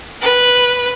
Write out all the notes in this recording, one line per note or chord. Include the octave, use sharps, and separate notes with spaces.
B4